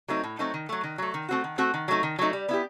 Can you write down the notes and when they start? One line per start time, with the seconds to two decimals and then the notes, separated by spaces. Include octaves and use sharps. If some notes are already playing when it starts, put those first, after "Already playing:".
0.08 F#3 A3 C4 D#4
0.24 A2
0.39 F#3 A3 C4 D#4
0.54 D#3
0.69 F#3 A3
0.84 D#3
0.98 F#3 A3
1.14 D#3
1.29 A3 C4 F#4
1.44 D#3
1.58 A3 C4 F#4
1.74 D#3
1.88 F#3 A3 D#4
2.03 D#3
2.19 F#3 A3 D#4
2.33 G3
2.49 B3 E4 G4